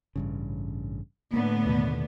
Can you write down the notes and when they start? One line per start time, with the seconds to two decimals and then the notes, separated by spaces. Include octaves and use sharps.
0.16 A1 G2 C#3
1.33 A2 D3 A#3 B3
1.66 D#2 B2 D#3